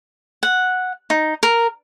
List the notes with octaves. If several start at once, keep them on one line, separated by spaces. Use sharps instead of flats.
F#5
D#4
A#4